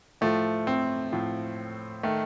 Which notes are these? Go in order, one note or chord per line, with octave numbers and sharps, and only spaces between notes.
A2 F3 A3
C4
A2 F3
D#3 A3